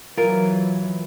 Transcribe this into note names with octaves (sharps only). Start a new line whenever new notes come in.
E3 F#3 F4 A#4